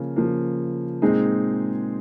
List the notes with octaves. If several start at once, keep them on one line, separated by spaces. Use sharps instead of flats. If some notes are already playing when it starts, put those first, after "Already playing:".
Already playing: C#3 F3 A#3
C#3 F3 A#3
A#2 G#3 C4 D#4 G#4